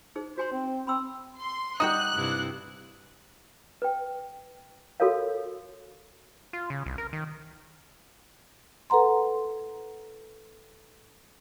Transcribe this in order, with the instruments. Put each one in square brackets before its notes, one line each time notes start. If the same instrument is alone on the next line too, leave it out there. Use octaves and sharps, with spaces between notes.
[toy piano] D#4 G#4 C5
[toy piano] F#4 G#5 C6 [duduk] C5
[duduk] C4
[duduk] C4 [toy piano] B5 C6 E6
[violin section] C6
[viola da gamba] G3 [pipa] D#4 F#4 G5 [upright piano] D#6 [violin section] F#6
[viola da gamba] G2 C3 E4
[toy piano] B4 G5
F#4 A4 A#4 C#5 F5
[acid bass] F4
C#3
C2
A#4
D#3
[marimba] A4 B4 F#5 A#5 C6